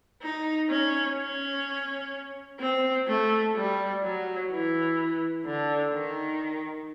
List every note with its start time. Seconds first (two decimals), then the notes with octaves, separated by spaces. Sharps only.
0.22 D#4
0.69 C#4
1.17 C#4
2.60 C4
3.07 A3
3.55 G3
4.03 F#3
4.51 E3
5.45 D3
5.94 D#3